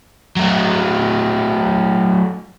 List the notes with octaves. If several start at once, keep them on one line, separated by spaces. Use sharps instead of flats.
F#3 A3